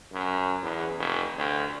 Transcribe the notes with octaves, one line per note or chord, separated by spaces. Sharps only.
F#2
E2
F1
D2